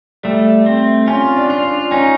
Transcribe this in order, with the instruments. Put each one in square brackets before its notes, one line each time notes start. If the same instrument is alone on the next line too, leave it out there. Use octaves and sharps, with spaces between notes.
[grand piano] G3 [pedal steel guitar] A3
[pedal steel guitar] C4
[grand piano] C#4 [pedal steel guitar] F4
[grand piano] D4
[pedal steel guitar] F4
[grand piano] D4
[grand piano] C#4 [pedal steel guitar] D#4